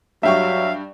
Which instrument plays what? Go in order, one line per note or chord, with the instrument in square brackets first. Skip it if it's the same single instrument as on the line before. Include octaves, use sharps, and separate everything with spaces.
[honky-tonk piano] G2 G4 C#6 [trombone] F#3 [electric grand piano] E5 [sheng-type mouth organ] F5